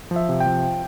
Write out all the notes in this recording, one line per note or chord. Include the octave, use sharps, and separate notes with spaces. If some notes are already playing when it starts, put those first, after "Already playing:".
F3
E5
C3
G5
F3